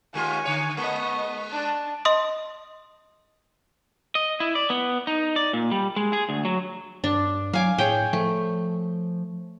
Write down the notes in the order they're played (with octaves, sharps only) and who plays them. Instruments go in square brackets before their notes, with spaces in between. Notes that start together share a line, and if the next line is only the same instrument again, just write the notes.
[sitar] D#2 G#3 F4 [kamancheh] G#5
[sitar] D3 C#5
[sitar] G#3 [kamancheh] B3 D#5
[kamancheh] D4 A5
[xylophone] D#5 C6 D#6
[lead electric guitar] D#5
E4
D5
B3
D#4
D5
A#2
G3
G#3
G#4
D2
F#3
[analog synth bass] G2 [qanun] D4
[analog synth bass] F#3 [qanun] F5 G#5 D6
[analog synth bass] A2 [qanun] G#4 C#5 G5
[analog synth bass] F3 [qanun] A3